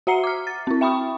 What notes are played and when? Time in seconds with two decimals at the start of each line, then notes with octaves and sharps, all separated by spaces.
0.07 F#4 E5 F#5 A#5 C7 C#7
0.24 D6 F6
0.47 A6
0.67 C4 E4
0.81 E5 G5 B5 C#6 D#6